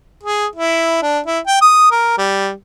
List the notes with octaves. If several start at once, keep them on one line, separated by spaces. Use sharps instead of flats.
G#4
E4
D4
E4
G5
D#6
A#4
G3